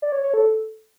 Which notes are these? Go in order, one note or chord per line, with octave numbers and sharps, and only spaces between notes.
D5
C#5
C#5
A4